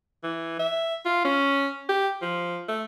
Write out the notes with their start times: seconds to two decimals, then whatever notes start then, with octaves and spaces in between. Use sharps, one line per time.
0.23 E3
0.60 E5
1.06 F4
1.25 C#4
1.89 G4
2.22 F3
2.69 A3